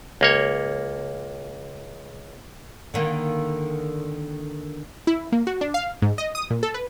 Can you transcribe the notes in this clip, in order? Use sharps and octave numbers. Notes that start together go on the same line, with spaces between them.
C#2 A#3 C#5
D3 D#3 A#3
E4
A#3
F#4
D4
F5
G#2
D#5
D#6
A#2
A4
B4